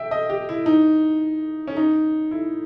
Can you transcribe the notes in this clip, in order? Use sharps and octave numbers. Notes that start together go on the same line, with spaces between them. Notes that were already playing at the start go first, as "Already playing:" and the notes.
Already playing: E5 G5
D#5
G4
E4
D#4
C#4
D#4
E4